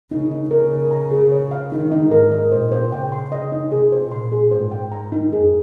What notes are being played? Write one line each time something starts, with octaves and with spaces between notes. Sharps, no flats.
C#3 D#4
D#4
C#3 A#4
D#5
A#5
G#4
C#5
F5
D#3 D#4
D#4
G#2 A#4
D#5
A#2 C5
C5
C#3 G5
C6
C#3 D#5
D#4
C3 G#4
C5
A#2 C6
G#4
G#2 C5
G5
A#5
D#4
F2 G#4